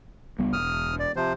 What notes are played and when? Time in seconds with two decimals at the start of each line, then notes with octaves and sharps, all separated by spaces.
0.39 C#2 G3 B3
0.53 E1 D#6 F6
0.99 D5
1.16 C3 F3 C5